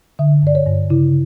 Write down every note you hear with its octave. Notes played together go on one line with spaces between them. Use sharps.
D3 E5
G2 D5
C#5
G2
C#3 E4